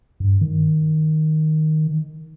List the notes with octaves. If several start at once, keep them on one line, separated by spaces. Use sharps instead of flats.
G2
D#3